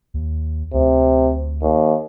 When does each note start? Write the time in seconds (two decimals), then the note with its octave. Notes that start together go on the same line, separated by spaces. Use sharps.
0.14 D#2
0.74 D2 C3
1.62 D#2